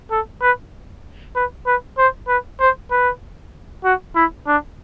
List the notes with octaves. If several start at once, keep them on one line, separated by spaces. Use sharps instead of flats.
A4
B4
B4
B4
C5
B4
C5
B4
F#4
E4
D4